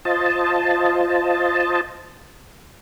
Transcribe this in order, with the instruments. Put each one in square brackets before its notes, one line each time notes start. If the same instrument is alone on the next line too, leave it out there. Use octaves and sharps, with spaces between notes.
[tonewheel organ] F4 C5 D#5 A5